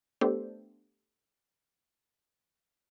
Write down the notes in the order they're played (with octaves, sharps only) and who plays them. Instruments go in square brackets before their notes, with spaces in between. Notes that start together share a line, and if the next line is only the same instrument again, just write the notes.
[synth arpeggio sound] A3 B3 D4 G4 A4 C5